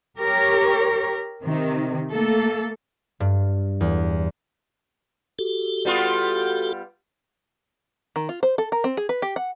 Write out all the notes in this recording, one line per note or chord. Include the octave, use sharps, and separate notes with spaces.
G4 A#4 C#5
C3 D#3 C4
A3 A#3 A4
G2
E2
F#4 G4 A4
G3 B3 F4
D#3
F4
C5
A4
A#4
C4
G#4
B4
G4
F#5